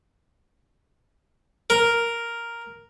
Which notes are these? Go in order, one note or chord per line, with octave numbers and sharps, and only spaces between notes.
A#4